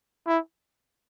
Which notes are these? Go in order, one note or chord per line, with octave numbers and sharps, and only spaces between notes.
E4